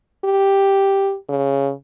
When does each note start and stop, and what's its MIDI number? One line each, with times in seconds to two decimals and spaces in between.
0.24 1.15 67
1.29 1.71 49